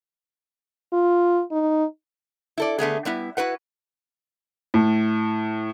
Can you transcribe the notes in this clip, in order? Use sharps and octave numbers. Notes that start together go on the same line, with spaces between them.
F4
D#4
E4 A4 D5
D3 A3 B3 G#4
G3 B3 E4
E4 F#4 B4 F#5
A2